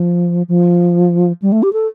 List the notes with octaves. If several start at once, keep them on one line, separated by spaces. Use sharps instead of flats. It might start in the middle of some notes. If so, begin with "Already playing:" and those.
Already playing: F3
F3
G3
A3
G4
A4